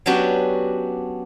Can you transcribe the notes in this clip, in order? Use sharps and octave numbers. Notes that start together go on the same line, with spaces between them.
F#3 B3 C#4 D4 F#4 G4